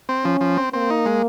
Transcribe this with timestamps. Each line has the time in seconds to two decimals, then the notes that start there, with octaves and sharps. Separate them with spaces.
0.09 C4
0.24 F3 C#4
0.41 F3
0.57 C4
0.73 A#3 C4
0.90 D#4
1.06 G#3